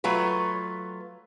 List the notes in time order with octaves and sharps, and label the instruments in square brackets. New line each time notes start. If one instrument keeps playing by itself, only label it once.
[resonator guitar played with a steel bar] F#3 A3 F4 B4